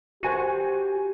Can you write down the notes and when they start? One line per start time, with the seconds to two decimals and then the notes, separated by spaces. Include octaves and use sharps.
0.23 F#4 G4 C5 G#5 D#7